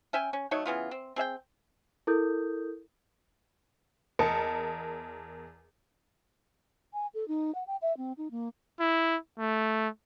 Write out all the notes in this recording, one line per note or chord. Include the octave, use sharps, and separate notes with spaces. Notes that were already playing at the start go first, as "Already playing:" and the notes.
C#4 E5 G5 G#5
C#4
F#3 A3 D#4 C#5
C#3 E3 B3 F4
C4
C4 G#4 E5 G5
E4 A4 A#4 D#6 G6
E2 A#4 D#5 A5 D#6 C#7
G#5
A4
D#4
F#5
G5
E5
C4
D#4
A#3
E4
A3